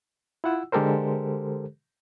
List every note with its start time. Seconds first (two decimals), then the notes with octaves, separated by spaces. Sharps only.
0.44 E4 F4 F#5 E6
0.72 D3 G#3 G4 A4 A#4 C5